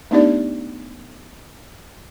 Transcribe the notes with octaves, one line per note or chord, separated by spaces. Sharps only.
A3 B3 D4 D#4 G4 D5